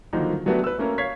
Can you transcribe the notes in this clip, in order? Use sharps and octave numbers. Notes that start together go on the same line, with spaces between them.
D3 D#3 F3 F#3 A#3 D#4
F#3
F#3 A3 B3 D4 F#4 G4
B4 E6
A3 A#3 C#4 A#4
C#5 F5 C#6 G#6 B6 C7